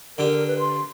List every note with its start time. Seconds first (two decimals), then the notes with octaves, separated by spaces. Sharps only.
0.18 D3 G4 A#4
0.47 B4
0.59 C6